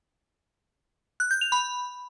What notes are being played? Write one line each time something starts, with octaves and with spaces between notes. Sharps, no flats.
F#6
G6
F7
B5